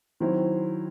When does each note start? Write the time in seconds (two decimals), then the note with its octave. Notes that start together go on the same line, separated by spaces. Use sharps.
0.20 D#3 F#3 C4 E4 C5